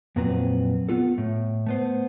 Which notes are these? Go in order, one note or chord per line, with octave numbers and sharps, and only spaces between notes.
F2 A#2 F#3 C4 B4 A#5
B3 F4 A4
A2
A3 B3 C5